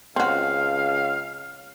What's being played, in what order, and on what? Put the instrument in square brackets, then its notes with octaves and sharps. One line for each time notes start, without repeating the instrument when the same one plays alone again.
[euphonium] C#2 [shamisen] C4 F#4 [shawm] F5